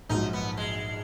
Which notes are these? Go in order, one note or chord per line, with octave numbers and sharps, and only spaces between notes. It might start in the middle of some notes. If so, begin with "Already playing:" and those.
A#1 G#2 F#3 D#4
B3
G#3